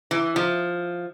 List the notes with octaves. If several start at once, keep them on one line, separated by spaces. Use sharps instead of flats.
E3
F3